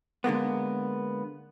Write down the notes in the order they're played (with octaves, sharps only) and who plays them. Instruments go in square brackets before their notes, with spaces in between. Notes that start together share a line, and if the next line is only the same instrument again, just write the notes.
[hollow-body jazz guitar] D3 G#3 A#3 B3